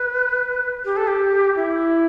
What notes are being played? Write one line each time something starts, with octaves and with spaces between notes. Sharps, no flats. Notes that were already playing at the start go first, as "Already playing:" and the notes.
Already playing: B4
G4
A4
G4
E4